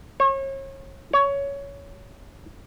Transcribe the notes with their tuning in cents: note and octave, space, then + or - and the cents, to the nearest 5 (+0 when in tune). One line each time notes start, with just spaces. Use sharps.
C#5 -35
C#5 +15